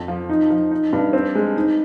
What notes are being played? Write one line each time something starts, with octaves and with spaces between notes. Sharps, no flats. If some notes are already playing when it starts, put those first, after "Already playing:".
Already playing: F2
F3
D#4
F3
D#4
G2
C4
G#3
D#4